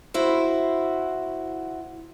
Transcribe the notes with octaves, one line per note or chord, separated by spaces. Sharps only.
E4 F#4 C5